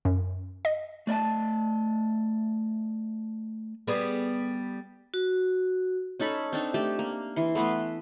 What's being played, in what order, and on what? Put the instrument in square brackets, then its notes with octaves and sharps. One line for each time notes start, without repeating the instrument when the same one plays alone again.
[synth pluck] F#2
D#5
[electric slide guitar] A3 D5 D#5 A5
[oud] G3 B3 G#4
[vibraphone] F#4
[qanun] C#4 D#4 A4 B5
C4 D4 D#4
A3 G4 A5
A#3
E3 C6
A3 B3 B4 C6